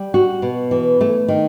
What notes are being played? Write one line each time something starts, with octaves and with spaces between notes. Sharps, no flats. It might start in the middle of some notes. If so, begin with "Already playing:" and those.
Already playing: G3
F#4
B2
E3
A3
D#3